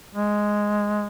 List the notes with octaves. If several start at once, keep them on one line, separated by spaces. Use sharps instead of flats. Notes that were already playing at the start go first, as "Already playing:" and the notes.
G#3